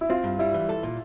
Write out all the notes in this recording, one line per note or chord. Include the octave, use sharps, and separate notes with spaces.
E4
C4 F4
G2
G3 E4
E3
A4
A#2